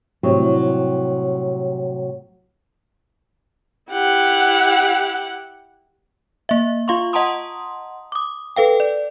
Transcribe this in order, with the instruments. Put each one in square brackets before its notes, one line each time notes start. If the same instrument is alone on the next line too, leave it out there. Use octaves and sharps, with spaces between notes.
[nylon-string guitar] A2 C3 F#3 G3
[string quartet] E4 G4 F#5
[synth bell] A#3 E5
F4 F5 C6 C#6
D#5 F#5 A5 A#5 C6 D#6
D6 D#6
A4 B4 F5 G5
D5